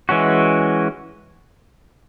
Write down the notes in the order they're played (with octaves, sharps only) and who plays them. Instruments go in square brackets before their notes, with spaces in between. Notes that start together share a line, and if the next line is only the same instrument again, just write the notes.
[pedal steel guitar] E3 G#3 C#4 F#4